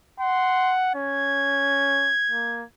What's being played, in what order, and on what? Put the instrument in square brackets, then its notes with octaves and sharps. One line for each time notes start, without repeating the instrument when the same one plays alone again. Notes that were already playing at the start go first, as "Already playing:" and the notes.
[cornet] F#5 [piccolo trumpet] C6
[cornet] C#4 [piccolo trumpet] G#6
[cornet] A#3